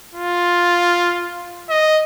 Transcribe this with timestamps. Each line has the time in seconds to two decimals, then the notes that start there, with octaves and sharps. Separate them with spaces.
0.14 F4
1.70 D#5